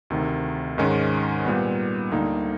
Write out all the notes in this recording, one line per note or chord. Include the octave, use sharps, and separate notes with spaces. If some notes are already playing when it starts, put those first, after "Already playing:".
D2 C3 D#3
G#2 D#3 G#3 C#4
A#2 G3 B3
D2 D3 G3 A#3 D#4